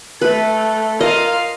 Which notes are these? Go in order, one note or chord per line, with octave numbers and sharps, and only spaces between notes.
A3 B4
F4 A#4 D#5 F5